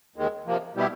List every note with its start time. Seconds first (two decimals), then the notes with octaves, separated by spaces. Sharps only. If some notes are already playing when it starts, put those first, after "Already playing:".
0.16 D#2 D#3 G#3
0.46 C3 F3 A#3
0.75 B2 G3 B3 E4 G4